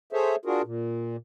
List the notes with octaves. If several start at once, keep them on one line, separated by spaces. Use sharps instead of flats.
G#4 A4 C5 C#5 E5
D4 F4 F#4 G#4 A#4
A#2